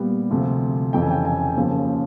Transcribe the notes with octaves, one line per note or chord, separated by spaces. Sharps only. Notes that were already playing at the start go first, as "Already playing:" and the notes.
Already playing: A#2 G3 B3
D2 C3 F3 A3
F2 C#3 E3 G5
G#5
G5
G#5
D#2 C#3 F3 A#3